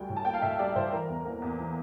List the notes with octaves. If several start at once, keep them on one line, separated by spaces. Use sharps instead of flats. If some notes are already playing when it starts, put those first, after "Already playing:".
Already playing: D2 G3 G5
A2
A5
A#3 G5
F5
A2 E5
G3 D5
A2 C5
E3 A#4
E2
A#3
E2
E3